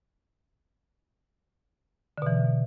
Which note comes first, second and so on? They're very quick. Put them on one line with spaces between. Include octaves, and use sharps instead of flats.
D3 B2 E3